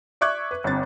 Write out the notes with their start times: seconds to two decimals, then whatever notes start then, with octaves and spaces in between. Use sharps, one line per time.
0.21 D5 E5 C#6 D6 F#6 G#6
0.51 B4
0.64 G1 C4 A6